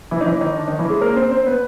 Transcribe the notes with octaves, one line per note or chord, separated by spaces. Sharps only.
E3 E4
D#4
E3 E4
D#3 D#4
D3 D4
D#3 D#4
E3 E4
G#3 G#4
A#3 A#4
C4 C5
C4 C5
B3 B4